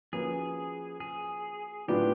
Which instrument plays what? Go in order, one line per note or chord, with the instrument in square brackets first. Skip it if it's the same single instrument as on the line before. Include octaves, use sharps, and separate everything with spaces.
[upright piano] F3 A#3 C#4 F#4 B4 [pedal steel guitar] G#4
[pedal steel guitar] G#4
[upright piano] A2 F#3 B3 D4 F4 [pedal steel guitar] G4